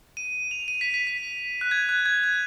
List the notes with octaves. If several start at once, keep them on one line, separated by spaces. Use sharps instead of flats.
D#7
F7
D#7
B6
B6
B6
F#6
G#6
F#6
G#6
F#6